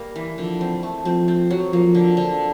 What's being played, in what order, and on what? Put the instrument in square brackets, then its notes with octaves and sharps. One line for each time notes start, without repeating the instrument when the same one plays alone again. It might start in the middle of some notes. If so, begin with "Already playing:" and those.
Already playing: [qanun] G3 A#3
E3
[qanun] D3 [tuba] F3
[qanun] C4
A3
[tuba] F3 [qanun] C4
[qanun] C4
F#3
[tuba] F3 [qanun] A#3
[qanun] D3
D3